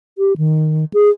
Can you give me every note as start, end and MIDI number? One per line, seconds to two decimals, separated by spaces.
0.18 0.37 67
0.37 0.85 51
0.94 1.09 68